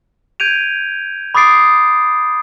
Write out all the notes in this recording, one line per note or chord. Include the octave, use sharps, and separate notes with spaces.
G6 G#6 D7 D#7 F7
B5 D6 D#6 A6 C7 D7